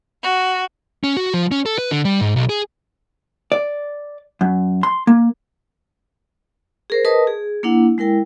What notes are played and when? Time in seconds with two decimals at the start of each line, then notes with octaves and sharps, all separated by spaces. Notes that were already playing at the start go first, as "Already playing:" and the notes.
0.23 F#4
1.04 C#4
1.17 F#4
1.34 F3
1.51 C#4
1.66 A4
1.78 B4
1.91 D3
2.05 G3
2.21 G#2
2.36 B1
2.49 G#4
3.52 D5
4.41 F#2
4.83 C6
5.07 A#3
6.90 G#4 A#4 C5
7.05 A#4 B4 D#5 A5 D#6
7.27 G#4
7.63 A#3 D4 E4 F#5
7.98 G#3 E4 A#4 G5